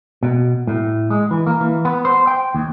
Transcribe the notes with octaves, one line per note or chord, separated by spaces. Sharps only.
B2
A2
G#3
E3
A#3
E3
B3
C5
G5
D#2